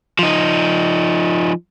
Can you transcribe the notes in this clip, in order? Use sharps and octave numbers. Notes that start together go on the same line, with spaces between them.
F3 D#4